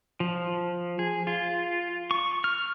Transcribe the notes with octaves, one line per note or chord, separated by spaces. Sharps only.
F3
G#4
F4
C#6
F6